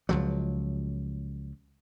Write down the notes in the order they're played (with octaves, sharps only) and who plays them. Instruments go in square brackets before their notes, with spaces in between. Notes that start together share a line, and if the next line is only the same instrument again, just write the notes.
[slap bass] C#2 F3 F#3